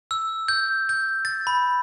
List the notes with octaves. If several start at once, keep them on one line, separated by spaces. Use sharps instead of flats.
E6
G6
G6
A6
B5